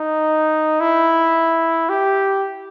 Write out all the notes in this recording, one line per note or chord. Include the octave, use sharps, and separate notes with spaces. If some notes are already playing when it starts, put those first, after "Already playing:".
Already playing: D#4
E4
G4